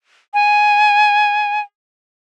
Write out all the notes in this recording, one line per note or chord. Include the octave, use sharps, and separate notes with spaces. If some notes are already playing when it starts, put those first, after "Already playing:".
G#5